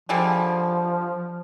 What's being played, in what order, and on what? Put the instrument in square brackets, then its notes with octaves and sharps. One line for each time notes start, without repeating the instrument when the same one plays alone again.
[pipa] D3 G3 G#3 [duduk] F3